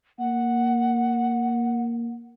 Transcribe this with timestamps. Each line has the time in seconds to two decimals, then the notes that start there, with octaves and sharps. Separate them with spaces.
0.19 A#3 F#5